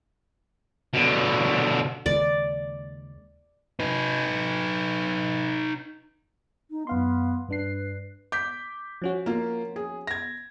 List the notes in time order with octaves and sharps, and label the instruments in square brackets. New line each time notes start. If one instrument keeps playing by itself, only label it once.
[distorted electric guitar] B2 D3
[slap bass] D#2 C#3 G#3 [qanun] D5
[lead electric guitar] D#4 B4
[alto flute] D#4
[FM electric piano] F#2 F5 C6 [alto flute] B3
[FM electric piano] G2 D4 C7 [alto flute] B4
[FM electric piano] D6 [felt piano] G6 B6
[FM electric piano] F3 C#4 F#4
[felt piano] A#3 F4
G#4
G#6 A#6